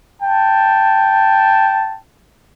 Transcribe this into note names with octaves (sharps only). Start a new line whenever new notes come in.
G5 A5